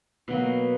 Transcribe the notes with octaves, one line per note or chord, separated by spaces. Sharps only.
B2 F#3 A#3